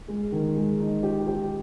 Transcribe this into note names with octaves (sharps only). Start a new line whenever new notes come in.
G#3
D#3
G#3
D#4
G4
G4